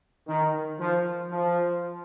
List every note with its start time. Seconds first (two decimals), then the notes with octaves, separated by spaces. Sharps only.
0.27 D#3
0.79 F3
1.30 F3